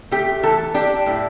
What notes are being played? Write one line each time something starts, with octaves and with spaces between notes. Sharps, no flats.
A3 G4
E3 A4
D4 G4
A2